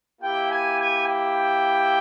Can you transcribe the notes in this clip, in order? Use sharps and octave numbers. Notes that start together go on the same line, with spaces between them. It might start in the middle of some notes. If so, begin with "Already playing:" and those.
A#3 E4 G4 G5
G#5
G#5
G5